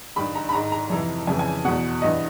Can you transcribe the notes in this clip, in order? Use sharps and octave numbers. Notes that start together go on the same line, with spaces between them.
G2 D#3 B5
A#5
B5
G#2 D#3 A#5
A#5
F2 C3 E3
F2 C#3 E3 G#5
G#5
E2 B2 F#5
G2 E3 D#5